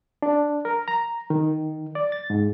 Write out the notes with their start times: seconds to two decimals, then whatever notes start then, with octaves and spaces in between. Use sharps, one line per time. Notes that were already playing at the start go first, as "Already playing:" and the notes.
0.22 D4
0.65 A#4
0.88 A#5
1.30 D#3
1.95 D5
2.12 A6
2.30 G#2